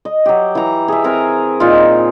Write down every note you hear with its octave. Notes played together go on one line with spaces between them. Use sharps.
D#5
F#3 G4
E3 A#5
G#4 E5
C4 A#4 G#5 A#5
A#2 D#4 F4